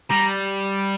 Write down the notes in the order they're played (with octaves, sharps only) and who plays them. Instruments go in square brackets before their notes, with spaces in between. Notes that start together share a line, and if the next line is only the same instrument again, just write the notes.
[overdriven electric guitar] G3 [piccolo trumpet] A#5